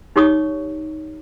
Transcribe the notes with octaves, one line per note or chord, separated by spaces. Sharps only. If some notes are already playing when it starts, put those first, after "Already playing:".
D#4 G4 C#5 C#6 D#6